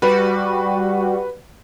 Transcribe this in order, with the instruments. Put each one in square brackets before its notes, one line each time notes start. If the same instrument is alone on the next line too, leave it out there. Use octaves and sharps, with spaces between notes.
[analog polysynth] G3 F#4 [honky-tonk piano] B4